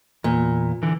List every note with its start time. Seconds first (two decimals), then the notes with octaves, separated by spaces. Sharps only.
0.24 E2 A#2
0.83 D3 E3